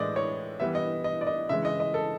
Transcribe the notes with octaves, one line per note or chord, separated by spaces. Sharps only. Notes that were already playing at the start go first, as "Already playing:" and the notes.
Already playing: A2 E3 G#3 D5 D#5
C#5
E3 G3 B3 E5
D#5
D#5
D5
D#5
C#3 E3 G#3 E5
D#5
D#5
A4